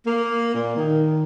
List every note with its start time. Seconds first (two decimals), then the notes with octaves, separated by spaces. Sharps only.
0.06 A#3
0.54 A#2
0.77 D#3